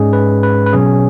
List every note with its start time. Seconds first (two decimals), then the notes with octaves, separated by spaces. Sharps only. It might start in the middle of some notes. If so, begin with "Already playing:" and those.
Already playing: G#2 G#3 C#4 G#4
0.13 B4
0.43 B4
0.66 B4
0.73 B2 F#3 C#4 G#4